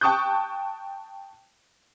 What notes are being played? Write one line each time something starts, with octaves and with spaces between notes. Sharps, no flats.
G5 A5 C#6 D#6 F#6 G6